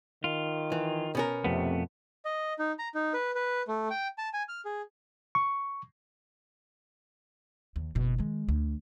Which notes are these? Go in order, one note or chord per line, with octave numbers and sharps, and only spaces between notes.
D#3 F4
E3
B2 C#4 A#4
F2 C3 A3 B3
D#5
D#4
A#5
D#4
B4
B4
A3
G5
A5
G#5
F6
G#4
C#6
D#2
F#1 B2
D#3 G#3
D2